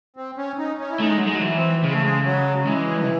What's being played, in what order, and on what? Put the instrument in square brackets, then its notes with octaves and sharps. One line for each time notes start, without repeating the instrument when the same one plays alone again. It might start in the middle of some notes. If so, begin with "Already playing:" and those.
[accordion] C4
C#4
D#4
C#4
E4
[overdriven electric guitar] A3 [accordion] D#4
[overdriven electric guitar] G#3
F#3
G#3
F#3
E3
[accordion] C4
[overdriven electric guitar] C#3 [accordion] G#3
[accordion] A3
G#3
F#3
[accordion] E3 [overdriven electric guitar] G#3
[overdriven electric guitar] C3